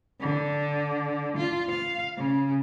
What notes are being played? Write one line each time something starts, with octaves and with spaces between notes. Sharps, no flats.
D3
F4
F5
C#3